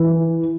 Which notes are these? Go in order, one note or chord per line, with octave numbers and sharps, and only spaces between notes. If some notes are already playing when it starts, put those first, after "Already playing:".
Already playing: E3